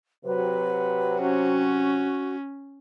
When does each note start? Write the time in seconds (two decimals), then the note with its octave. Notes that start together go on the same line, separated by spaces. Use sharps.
0.25 C3 F#3 B4
1.21 C#4 F#4